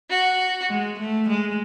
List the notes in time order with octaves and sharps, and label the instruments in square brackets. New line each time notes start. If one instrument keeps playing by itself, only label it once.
[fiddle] F#4
[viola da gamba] G#3
A3
G#3